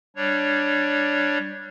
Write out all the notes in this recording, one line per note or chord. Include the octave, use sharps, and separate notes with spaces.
G3 D4 C#5